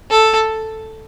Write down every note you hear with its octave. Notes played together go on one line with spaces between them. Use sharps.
A4